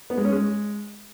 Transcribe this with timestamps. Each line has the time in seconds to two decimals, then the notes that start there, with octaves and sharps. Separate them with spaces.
0.10 B3
0.17 G#3
0.25 C#4
0.32 G#3